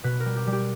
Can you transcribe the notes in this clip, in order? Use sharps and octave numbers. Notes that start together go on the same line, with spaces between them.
B2 B4
A#4
G3
G4
G3
G4